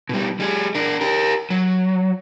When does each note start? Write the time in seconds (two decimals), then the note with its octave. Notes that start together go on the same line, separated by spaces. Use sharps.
0.09 B2 G3
0.40 G3 G#4
0.75 D4 A#4
1.01 G4 A#4
1.50 F#3